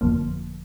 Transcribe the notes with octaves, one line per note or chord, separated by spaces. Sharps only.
G1 F2 D3 F3 A#3